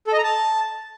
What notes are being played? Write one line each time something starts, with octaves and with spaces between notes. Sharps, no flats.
A4
D#5
A#5
A5